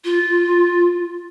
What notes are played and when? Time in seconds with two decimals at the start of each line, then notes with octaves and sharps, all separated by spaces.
0.05 F4